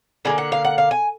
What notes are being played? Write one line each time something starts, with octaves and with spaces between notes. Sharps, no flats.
D3 G3 A#3 G#5
F#5
F5
F#5
F5
G#5